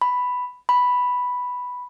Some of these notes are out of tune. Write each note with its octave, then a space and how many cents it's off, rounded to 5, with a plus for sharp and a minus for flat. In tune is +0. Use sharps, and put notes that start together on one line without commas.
B5 +5
B5 +0